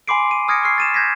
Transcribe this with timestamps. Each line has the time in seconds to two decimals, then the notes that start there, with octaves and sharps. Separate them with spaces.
0.08 G#5 B5 C6 D6 C7 D7
0.31 D#7
0.48 D#6 F6 G#6 A#6 C#7 D7
0.63 C#6 E6 F6 C7
0.78 A6 D#7 E7
0.94 G6 G#6 A#6 B6